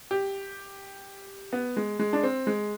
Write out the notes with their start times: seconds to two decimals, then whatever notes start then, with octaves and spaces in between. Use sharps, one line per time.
0.11 G4
1.53 B3
1.77 G#3
1.99 G#3
2.13 D4
2.24 C4
2.47 G#3